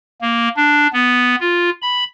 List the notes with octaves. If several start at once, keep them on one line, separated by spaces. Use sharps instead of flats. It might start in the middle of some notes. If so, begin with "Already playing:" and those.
A#3
D4
B3
F4
B5